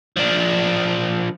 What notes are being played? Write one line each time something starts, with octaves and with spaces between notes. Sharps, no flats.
F3 D4